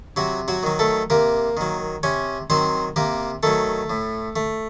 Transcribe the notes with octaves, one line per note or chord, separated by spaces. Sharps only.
C3 F#3 F#4
F#3 F#4
D#3 F#3
A3 A4
C3 A#3 A#4
D#3 F#3
C3 C#4 C#5
D#3 F#3 C4 C5
C3 A#3 A#4
D#3 F#3 A3 A4
A2
A3